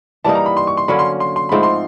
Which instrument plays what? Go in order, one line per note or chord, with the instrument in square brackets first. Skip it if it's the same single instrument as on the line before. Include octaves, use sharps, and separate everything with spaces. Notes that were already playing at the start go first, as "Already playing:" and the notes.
[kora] E3 G3 A#3 D#4 [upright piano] A5
[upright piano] A#5
B5
C6
C#6
C6
[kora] D3 F#3 A#3 C#4 [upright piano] B5
[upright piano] C6
C6
C6
[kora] G#2 F3 A3 C4 [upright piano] B5
[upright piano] C6